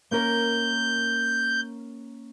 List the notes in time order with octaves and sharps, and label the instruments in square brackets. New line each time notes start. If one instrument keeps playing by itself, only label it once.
[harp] A#3 C#4 A#4 [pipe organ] G6